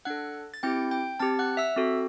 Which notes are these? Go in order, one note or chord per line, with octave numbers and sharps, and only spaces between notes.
D4 A4 F#5 F#6
A6
C4 E4 G4 G5 G6
G5 G6
C4 G4 A5 A6
F#5 F#6
E5 E6
C4 F#4 A4